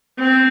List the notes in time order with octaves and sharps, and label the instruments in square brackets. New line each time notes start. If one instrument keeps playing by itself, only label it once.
[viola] C4